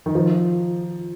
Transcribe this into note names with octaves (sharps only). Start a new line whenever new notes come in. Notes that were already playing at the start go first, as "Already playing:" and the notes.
D#3
F3